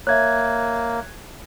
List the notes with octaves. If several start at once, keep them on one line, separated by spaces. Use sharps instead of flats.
A#3 C#5 E5 F#6 G#6